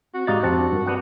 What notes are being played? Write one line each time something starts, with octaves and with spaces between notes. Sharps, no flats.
C4 F#4
G#2 D#4 F#4 G4 D5 F5 A6
F2 C4 G4 F#5 A5
D4
G2 A#4
B3 C4 D4 F#5